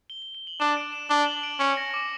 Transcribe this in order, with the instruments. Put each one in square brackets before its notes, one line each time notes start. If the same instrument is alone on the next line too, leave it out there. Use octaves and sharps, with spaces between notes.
[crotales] G7
G7
G7
F#7
[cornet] D4 [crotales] E7
[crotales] D7
E7
[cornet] D4 [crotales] G7
[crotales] F#7
D7
[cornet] C#4 [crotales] C#7
[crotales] A#6
D6